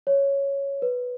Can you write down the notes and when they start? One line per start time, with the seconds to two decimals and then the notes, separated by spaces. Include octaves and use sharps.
0.07 C#5
0.82 B4